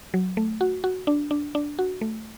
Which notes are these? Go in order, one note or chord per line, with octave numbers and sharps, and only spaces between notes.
F#3
A3
F#4
F#4
D4
D4
D4
F#4
A3